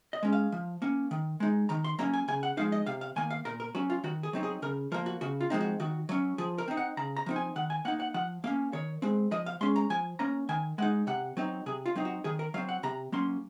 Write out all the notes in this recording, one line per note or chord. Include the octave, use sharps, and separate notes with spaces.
D#5
G#3 C#4
F5
F3
A#3 C#4
D#3
G#3 D#4
D#3 A#5
C6
F#3 A#3 C#4 A#5
G#5
C#3 G#5
F#5
F3 G#3 D#4 F5
D#5
C3 F5
F5
D#3 A#3 G#5
F5
A#2 A#4
A#4
F#3 C#4 F#4
F4
D#3 F#4
G#4
F#3 C4 D#4
G#4
C#3 A#4
F3 A#3 A#4
F#4
C#3 F#4
F4
F3 G#3 C4 D#4
F#4
D#3 F#4
F#3 C#4
F3 G#4
A#4
C4 D#4
F#5
C#3 A#5
A#5
F3 C4 D#4
G#5
D#3 F#5
G#5
A#3 D#4 F#5
F#5
F3 F#5
A#3 C#4 F5
D#3 C#5
G#3 C4
F3 D#5
F5
G#3 C#4 C6
A#5
F3 G#5
A#3 C#4 A#5
D#3 G#5
G#3 D#4 F#5
C3 F#5
F#3 C4 D#4
C3 G#4
F4
F#3 C4 D#4
F#4
D#3 G#4
A#4
F#3 C4 F5
F#5
C3 A#5
F#3 A#3 C#4 C6